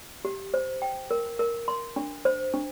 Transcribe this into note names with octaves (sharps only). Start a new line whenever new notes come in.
G4
C5
G5
A#4
A#4
C6
D4
C5
D4